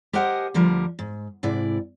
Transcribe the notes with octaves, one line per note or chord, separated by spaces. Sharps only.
G4 A#4 C5 D#5 F#5 G#5
D2 D3 F3 G3 A#4
G#2
G#2 C3 E4 D5